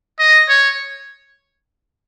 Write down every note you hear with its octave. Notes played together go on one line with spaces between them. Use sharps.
D#5
C#5